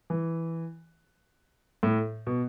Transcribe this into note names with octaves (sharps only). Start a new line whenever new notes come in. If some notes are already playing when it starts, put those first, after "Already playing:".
E3
A2
B2